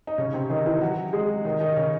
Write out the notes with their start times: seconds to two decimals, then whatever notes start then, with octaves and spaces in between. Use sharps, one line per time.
0.07 D#4
0.18 C#3 C#4
0.33 C3 C4
0.50 D#3 D#4
0.66 E3 E4
0.81 F#3 F#4
1.13 G#3 G#4
1.45 D#3 D#4
1.60 D#3 D#4
1.76 C#3 C#4